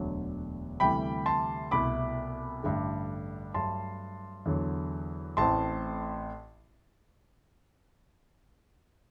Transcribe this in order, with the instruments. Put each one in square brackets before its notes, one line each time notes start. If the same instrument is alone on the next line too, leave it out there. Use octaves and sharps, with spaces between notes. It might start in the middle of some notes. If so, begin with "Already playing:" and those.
Already playing: [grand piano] E1 D2 D3 F#3
D2 C3 E3 G3 G5 B5
A5 C6
C2 B2 A3 E4 B5 D6
A1 G2 D3 A3
G2 F#3 A3 A5 C6
E2 D3 F#3
A1 A2 E3 A3 C4 A5 C6